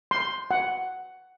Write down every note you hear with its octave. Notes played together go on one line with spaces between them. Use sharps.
C6
F#5